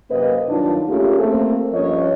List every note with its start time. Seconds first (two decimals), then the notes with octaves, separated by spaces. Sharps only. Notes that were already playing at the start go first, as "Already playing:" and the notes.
0.11 F#2 C3 A#3 C4 B4 D#5
0.49 G2 D#3 F#3 D4 D#4 F4
0.88 A3 A#3 C#4 F4 G4 G#4
1.18 A3 A#3 C4
1.72 G2 F3 C#4 C#5 D#5